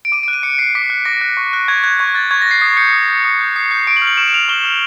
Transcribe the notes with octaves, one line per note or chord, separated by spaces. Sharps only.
D7
D6 D#7
D7
F#6
D#7
D6 C#7
F#6 C7
D6 B6
F#6
D6 A#6
F#6
C#6
F#6
C#6 G#6
F#6 G#6
C#6 G#6
F#6 A6
C#6 G#6
A#6
F#6 C7
D#6 C7
G6 C#7
D#6
G6
D#6
G6
D#6 C7
G6 C7
C#6 D7
F#7
F6
F#7
C#6 E7
E7
F6 F7
C#6 G7
F6